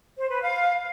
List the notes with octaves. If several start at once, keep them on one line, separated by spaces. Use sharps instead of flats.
C5
B4
F5